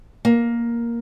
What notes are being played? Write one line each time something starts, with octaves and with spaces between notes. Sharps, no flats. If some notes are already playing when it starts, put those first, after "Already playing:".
A#3